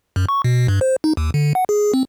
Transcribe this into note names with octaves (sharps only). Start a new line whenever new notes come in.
F#2
C#6
B2
G2
C5
D#4
D#2
D3
F#5
G#4
C4